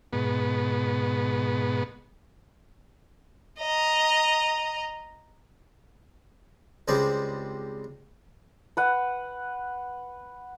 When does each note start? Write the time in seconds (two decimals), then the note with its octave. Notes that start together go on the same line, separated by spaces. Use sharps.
0.13 G#2 B2 B3
3.60 D#5 A#5
6.88 C#2 G3 G#3 C4 D5
8.77 B4 F#5